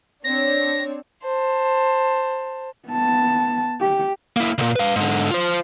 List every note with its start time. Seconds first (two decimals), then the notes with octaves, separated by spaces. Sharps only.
0.24 C4 D4 C#5 A#6
1.23 C5 A5
2.89 B3 A5
3.81 G4
4.37 A#3 E4
4.58 C#2 A#2
4.76 B4 F5
4.96 G#2 D3
5.31 F4 C5